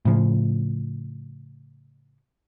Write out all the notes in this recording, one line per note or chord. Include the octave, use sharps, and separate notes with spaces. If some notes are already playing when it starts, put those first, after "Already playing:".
A2 C#3 F3